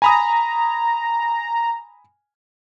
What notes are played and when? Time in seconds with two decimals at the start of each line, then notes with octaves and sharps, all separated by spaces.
0.02 G#5 A#5 B5 D#6